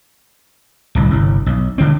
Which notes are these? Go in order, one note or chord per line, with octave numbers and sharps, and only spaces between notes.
D1 C2
G1 C2
B1
E1 D3 C4